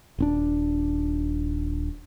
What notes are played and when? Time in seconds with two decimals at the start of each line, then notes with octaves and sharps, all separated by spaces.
0.18 D#1 C4 D4